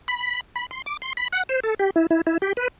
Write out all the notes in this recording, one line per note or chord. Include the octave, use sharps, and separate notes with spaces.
B5
B5
C6
D6
C6
B5
F#5
C5
A4
G4
E4
E4
E4
G4
B4